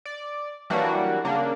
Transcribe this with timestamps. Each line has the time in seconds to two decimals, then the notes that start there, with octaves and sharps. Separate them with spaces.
0.05 D5
0.70 E3 F#3 G3 A#3 D4 F#4
1.24 C#3 A#3 D4